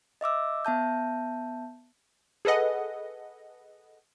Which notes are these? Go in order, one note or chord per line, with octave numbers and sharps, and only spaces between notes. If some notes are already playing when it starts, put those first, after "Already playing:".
D#5 E5 D6 E6
B3 E5 A5 G6
G#4 A4 B4 D#5 F#5